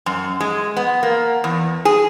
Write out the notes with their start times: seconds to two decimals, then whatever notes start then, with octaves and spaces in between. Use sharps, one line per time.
0.06 F#2
0.40 G#3
0.76 B3
1.03 A#3
1.44 E2
1.85 G#4